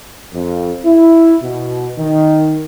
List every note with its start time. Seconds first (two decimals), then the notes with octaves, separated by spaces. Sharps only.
0.34 F2
0.85 E4
1.43 B2
1.98 D#3